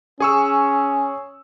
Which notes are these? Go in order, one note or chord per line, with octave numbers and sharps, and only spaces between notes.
C#4 G#4 C#6 E6